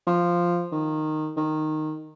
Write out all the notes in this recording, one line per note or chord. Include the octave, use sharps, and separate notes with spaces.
F3
D#3
D#3